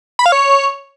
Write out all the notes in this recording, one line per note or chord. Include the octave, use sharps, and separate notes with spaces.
B5
F5
C#5